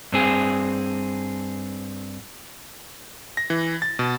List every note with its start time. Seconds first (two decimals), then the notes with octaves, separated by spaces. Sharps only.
0.12 G2 C4 G#4
3.37 A#6
3.50 E3
3.82 A6
3.99 B2